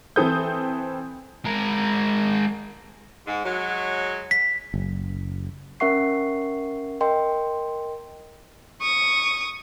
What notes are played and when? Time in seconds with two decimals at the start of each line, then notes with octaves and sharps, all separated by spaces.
0.16 E3 C4 A4 D#6 G6
1.45 G#3 A#4
3.27 G#2
3.45 F#3 G#3
4.31 B6
4.74 F#1
5.80 C#4 A#4 E5 F#5 C#6 C7
7.01 A#4 D#5 G5 C6
8.81 C#6 D#6